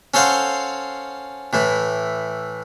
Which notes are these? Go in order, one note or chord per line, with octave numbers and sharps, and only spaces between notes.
C#4 A4 C5 F5 F#5 C6
A2 E3 E4